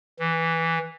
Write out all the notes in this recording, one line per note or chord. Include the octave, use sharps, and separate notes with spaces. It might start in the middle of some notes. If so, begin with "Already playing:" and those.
E3